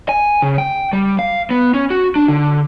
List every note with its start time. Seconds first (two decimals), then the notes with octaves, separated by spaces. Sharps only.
0.09 G#5
0.42 C#3
0.58 G5
0.93 G3
1.19 F5
1.51 B3
1.74 C#4
1.90 F#4
2.16 D4
2.28 D3